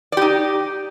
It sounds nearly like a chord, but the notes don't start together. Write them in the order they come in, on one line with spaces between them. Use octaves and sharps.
D5 G4 D#4